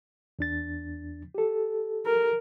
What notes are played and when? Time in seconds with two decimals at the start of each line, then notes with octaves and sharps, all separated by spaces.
0.39 E2 D4 A6
1.35 G4 A4
2.06 A#4